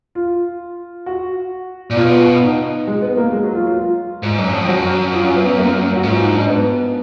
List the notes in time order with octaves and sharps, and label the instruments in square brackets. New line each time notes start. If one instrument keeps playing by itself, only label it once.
[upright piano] F4
F#4
[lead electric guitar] A#2
[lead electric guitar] B2 [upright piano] F4
[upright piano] F4
D#4
G#3
B3
A#3
G#3
F#3
F4
F4
[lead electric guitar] G#2
F#2
F2
[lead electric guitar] F#2 [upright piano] F#4
[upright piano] F4
B3
A#3
F#4
[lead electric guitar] G#2
[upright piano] F4
D#4
D4
B3